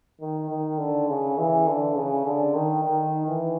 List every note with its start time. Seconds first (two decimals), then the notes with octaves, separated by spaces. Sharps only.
0.21 D#3
0.50 D#3
0.79 D3
1.09 C#3
1.38 E3
1.68 D3
1.96 C#3
2.26 D3
2.55 D#3
2.84 D#3
3.28 E3